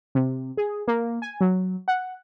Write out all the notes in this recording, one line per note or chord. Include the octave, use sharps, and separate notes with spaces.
C3
G#4
A#3
G#5
F#3
F#5